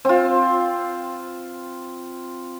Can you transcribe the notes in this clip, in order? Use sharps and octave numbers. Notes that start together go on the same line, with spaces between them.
C4 F4